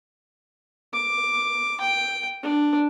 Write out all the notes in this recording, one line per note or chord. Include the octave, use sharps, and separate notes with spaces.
D6
G5
D4